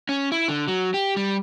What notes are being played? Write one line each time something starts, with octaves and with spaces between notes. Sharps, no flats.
C#4
E4
D3
F#3
G4
G3